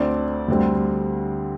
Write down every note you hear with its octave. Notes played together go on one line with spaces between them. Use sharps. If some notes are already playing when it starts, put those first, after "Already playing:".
Already playing: D2 D3 A3 C4 D5
D2 D3 G3 C4